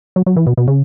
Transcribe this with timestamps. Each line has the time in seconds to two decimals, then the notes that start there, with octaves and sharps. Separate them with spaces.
0.16 F#3
0.26 F#3
0.37 E3
0.47 B2
0.57 B2
0.68 C#3